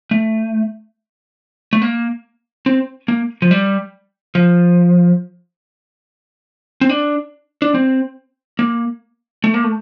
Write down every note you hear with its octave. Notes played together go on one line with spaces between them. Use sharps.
A3
A3
A#3
C4
A#3
F3
G3
F3
C4
D4
D4
C4
A#3
A3
A#3
A3